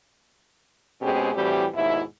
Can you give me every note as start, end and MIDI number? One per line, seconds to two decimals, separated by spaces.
1.02 1.32 47
1.02 1.32 56
1.02 1.32 60
1.02 1.32 61
1.02 1.32 67
1.02 1.32 68
1.34 1.66 45
1.34 1.66 52
1.34 1.66 55
1.34 1.66 60
1.34 1.66 66
1.34 1.66 67
1.74 2.01 39
1.74 2.01 44
1.74 2.01 47
1.74 2.01 64